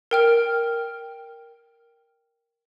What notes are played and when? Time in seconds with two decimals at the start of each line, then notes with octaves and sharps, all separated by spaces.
0.11 A#4 G5 F6